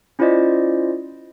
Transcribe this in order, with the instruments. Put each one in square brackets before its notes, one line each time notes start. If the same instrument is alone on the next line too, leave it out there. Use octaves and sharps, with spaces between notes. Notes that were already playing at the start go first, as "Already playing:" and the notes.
[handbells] C#4 E4 F4 C5 D5 D#5